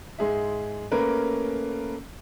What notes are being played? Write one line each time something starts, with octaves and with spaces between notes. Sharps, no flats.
G#2 G#3 G#4 E5
A3 A#3 C#4 A#4 B4